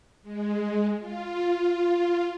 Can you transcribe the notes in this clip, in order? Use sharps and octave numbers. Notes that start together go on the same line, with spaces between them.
G#3
F4